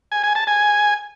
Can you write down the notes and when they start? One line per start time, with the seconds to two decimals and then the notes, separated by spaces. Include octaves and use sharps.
0.12 G#5
0.23 G#5
0.35 A5
0.47 G#5